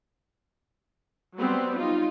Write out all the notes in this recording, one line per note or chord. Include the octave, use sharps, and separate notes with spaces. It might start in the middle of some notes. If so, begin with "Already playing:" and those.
F#3 G3 B3 C4
D#4 F4